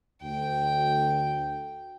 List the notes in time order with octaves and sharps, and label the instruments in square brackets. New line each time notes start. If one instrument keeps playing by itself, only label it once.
[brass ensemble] D2 [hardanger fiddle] G5